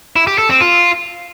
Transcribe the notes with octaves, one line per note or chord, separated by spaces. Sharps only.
E4
G4
A4
C4
F4